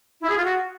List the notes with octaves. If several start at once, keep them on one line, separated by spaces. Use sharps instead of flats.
E4
G#4
F4
F#4